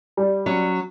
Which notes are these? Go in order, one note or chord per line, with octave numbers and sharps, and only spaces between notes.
G3
F#3 C#4